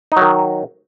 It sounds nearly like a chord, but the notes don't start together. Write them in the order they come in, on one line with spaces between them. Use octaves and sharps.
D#4 F#3 D#3